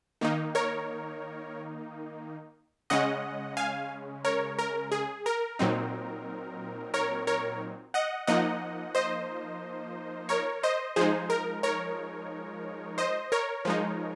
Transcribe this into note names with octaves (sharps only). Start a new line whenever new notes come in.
D#3 A#3 D#4
A#4 C#5
C#3 G#3 C#4 D#5 F#5
F5 G#5
A#4 C#5
A#4
G#4
A#4
A#2 F#3 C4 D#4
A#4 C#5
A#4 C#5
D#5 F#5
F3 A#3 D#4 D#5 F#5
C5 D#5
A#4 C#5
C5 D#5
F3 G#3 D#4 G#4 C5
A#4
A#4 C#5
C5 D#5
A#4 C#5
F3 G#3 D#4